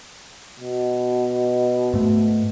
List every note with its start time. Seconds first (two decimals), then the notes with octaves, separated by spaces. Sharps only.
0.60 B2
1.93 G#2 A3